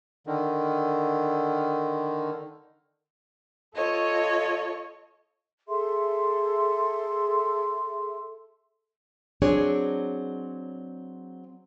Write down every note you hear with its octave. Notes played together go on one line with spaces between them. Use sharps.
D3 D#3
F4 A4 C#5 D#5
G#4 A4 E5 C6
F#3 C4 D4 G#4 C#5